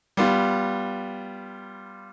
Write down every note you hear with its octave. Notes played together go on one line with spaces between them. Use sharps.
G3 B3 F4